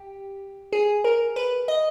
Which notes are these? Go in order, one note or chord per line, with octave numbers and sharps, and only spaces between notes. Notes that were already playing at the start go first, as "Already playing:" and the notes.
Already playing: G4
G#4
A#4
B4
D#5